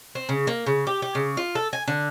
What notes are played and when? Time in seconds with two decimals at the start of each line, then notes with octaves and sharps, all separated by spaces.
0.15 C4
0.29 C#3
0.47 A#3
0.66 C#3
0.87 G4
1.02 G4
1.15 C#3
1.37 F4
1.55 A4
1.73 G#5
1.88 D3